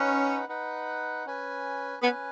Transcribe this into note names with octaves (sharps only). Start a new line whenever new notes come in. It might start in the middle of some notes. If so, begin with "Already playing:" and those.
Already playing: C#4 D#4 B4 F#5
D#4 B4 F#5
C#4 B4 G#5
B3 C#4 B4 G#5